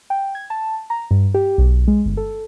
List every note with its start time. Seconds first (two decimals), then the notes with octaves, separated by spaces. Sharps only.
0.10 G5
0.35 G#6
0.50 A5
0.90 A#5
1.11 G2
1.34 G4
1.58 B1
1.88 G#3
2.06 G1
2.17 A4